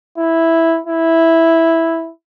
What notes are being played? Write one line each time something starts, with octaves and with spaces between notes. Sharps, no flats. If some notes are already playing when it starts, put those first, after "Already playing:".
E4
E4